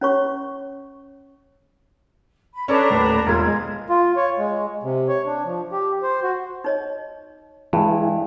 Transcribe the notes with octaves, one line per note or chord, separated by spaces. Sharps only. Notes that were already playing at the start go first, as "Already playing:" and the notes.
C#4 C#5 C#6
B5
C#4 D4 A4 B4 D5 A#5
D#1 A2
E1 F4 G#6
G#3
F4
C#5
G#3
C3
C#5
D4
F3
G4
C5
F#4
D#4 C#5 D#5
G2 E3 G#3 E4 G#4